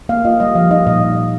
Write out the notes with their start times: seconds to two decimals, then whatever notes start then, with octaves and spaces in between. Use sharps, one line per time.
0.09 A#3 F5
0.25 F4 D#5
0.40 G3 D#5
0.55 F3 F5
0.71 D#4 D#5
0.87 A#2 D#5